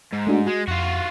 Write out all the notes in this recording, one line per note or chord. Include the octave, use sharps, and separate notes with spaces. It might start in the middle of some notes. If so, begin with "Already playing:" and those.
G#2
A3 D4 F#4
G#3 F#4
F2 F4 F#4